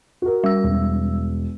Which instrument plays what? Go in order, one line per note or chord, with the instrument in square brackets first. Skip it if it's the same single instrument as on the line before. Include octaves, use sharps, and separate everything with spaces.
[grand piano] F#4 A#4
[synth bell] G3 E6
[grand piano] E1